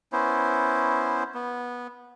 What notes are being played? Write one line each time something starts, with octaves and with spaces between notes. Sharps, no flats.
B3 C#4 E4 C5
B3